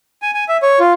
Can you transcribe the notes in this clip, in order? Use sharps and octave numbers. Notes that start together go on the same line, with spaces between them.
G#5
G#5
E5
C#5
F4